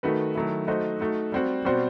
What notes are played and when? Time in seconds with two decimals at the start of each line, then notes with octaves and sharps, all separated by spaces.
0.03 D#3 A3 D#4 F#4 B4
0.35 D#3 F#3 A3 E4
0.67 A3 D#4 F#4 C5 D#5
1.00 A3 D#4 F#4
1.32 G3 C4 F#4
1.65 B2 G3 C4 F#4 C5